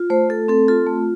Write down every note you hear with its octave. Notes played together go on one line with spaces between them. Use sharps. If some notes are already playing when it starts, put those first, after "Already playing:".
Already playing: F4
A3 C5
A3 A4
C4 A4
F4 A4
A3